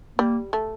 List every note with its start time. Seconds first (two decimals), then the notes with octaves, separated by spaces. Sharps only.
0.18 G3 A#3
0.53 A3